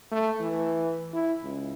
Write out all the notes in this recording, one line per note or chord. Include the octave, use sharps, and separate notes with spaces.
A3
E3
E4
C#2